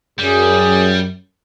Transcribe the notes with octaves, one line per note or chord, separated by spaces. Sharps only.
F#2 G3 G#4